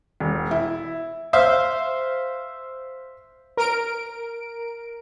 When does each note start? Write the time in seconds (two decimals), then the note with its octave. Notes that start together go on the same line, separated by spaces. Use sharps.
0.20 E1
0.51 E4
1.33 C5 E5 F5
3.57 A#4 D7